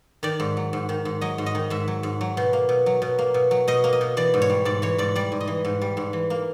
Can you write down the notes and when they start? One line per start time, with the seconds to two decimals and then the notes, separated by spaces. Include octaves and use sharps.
0.23 D#3 D5
0.40 G#2
0.57 F#3
0.73 G#2
0.89 D#3
1.05 G#2
1.21 F#3 D#5
1.38 G#2
1.46 D#5
1.55 D#3
1.70 G#2 E5
1.88 F#3
2.03 G#2
2.21 F#3
2.37 B2
2.53 A#3
2.69 B2
2.86 F#3
3.02 B2
3.18 A#3
3.34 B2
3.51 F#3
3.67 B2 D#5
3.84 A#3
3.93 D#5
4.01 B2
4.17 E3 D5
4.34 G#2
4.42 C#5
4.50 G3
4.65 G#2 D5
4.82 E3 C#5
4.98 G#2 D5
5.15 G3 D5
5.32 G#2
5.40 D#5
5.47 E3
5.64 G#2
5.81 G3
5.97 G#2
6.13 E3
6.30 A#3